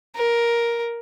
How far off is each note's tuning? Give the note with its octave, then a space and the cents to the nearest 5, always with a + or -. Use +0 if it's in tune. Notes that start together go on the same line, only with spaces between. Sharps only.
A#4 +10